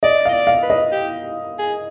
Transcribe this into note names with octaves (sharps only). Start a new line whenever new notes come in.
D5 D#5
D#5 F5
D5
F5
B4
D#5
G4
G#4